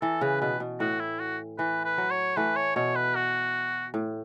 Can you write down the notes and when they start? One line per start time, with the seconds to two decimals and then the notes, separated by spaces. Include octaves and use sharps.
0.02 E3 A4
0.21 C#3 B4
0.41 B2 B4
0.60 B2
0.80 A2 F#4
1.00 E4
1.20 F#4
1.58 E3 B4
1.85 B4
1.98 F#3
2.11 C#5
2.37 E3 A3 B4
2.56 C#5
2.76 B2 C#5
2.96 B4
3.16 F#4
3.94 A2